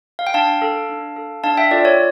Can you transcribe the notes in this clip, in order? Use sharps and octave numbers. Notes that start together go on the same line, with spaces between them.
F5
G5
D4 F5 A5
A4
D4
A4
D4 F5 A5
E5 G5
F4 A4 D5
C#5